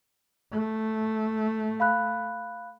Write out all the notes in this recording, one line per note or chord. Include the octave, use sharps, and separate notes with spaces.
A3
F5 B5 F#6